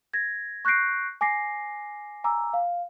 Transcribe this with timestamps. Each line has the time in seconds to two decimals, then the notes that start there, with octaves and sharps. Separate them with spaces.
0.13 G#6 A#6
0.65 C#6 F#6 G6 A#6 C7 D7
1.21 G#5 D6 A#6 C7
2.24 G#5 A#5 D6 E6
2.53 F5